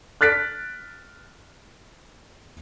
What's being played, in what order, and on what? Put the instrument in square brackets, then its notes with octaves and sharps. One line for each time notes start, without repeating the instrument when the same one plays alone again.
[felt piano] F6 F#6 A6 B6 D7